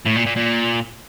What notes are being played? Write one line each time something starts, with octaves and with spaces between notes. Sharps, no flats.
A2
A#2
A#2
A#2